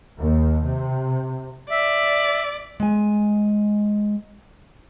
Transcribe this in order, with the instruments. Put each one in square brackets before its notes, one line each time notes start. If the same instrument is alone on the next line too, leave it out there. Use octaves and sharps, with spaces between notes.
[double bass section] D#2
C3
[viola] D5 [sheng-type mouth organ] E5
[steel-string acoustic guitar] G#3 G#5